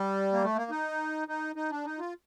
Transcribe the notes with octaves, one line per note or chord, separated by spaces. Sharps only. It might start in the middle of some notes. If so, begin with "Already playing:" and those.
Already playing: G3
A#3
A3
A#3
D#4
D#4
D#4
D4
D#4
F4